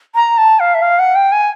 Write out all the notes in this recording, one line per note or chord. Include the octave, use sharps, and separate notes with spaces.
A#5
A5
F5
E5
F5
F#5
G5
G#5